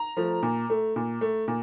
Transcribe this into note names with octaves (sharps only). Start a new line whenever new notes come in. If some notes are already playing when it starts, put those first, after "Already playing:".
Already playing: A#5
F3 A3
A#2
A3
A#2
A3
A#2